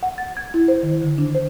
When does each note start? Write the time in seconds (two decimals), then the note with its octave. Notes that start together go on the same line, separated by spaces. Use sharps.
0.03 F#5
0.18 A6
0.37 G#6
0.54 E4
0.68 C5
0.83 D#3
1.02 D3
1.18 D4
1.35 C5